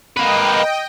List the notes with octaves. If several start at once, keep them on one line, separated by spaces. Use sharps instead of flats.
A#3 B4 D#5 G5